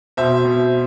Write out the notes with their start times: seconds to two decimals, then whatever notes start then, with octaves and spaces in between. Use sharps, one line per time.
0.17 B2 C5 E5
0.45 B2